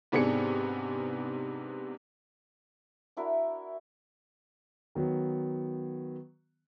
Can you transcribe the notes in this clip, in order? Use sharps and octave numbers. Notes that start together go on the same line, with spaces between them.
G#2 C3 B3 D4 G#4 C#7
D4 E4 F#4 A#4
D#3 F#3 B3